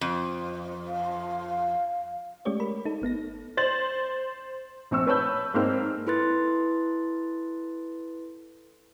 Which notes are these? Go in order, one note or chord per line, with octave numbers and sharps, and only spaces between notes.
F2
F5
G#3 A3 C#4 G4 C#5 D5
A#4 B5
D#4 A4
G#1 B3 D#4 A#6
C5 A6 F#7
A#1 C4 C#6 E6
B4 C#5 A5 B5 G6
G#2 A#3 C4 F6
E4 A4 B4 C6 F#6 A6